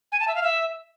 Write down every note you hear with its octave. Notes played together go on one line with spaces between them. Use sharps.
G#5
A5
E5
F5
E5